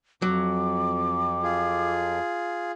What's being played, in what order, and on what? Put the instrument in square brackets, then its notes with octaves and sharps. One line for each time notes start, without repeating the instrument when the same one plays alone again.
[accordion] F2 [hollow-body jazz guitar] F#3 [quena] D6
[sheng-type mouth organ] F4 G#4